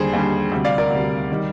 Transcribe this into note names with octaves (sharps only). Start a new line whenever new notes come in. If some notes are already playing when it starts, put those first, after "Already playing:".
Already playing: D#2 D3 G3 G#4 C5
D#2 D3 G3
D2 C3 G3
D5 F5
A#4 D5
D2 C3 G3
D#3 G3